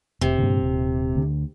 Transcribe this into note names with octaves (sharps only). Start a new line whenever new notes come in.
F1 C3
G2 A#2 D3
D#1
D2 D3